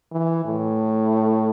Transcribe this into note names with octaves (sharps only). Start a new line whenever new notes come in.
E3
A2